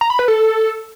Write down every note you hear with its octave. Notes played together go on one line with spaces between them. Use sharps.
A#5
B5
B4
A4